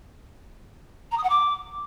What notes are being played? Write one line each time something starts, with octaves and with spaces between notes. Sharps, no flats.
A#5
D#6
F#5
D6